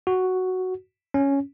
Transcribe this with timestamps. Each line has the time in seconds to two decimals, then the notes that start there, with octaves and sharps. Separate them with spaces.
0.07 F#4
1.14 C#4